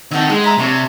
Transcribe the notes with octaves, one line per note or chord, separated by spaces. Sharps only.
D#3 C4 F#4 A4
G#3 F#6
E5 A#5 B5
C3 D4 C#5